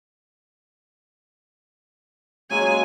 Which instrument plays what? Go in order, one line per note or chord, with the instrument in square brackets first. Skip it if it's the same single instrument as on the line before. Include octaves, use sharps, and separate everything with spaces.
[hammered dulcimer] C#3 F#3 A#3 [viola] G#3 G#5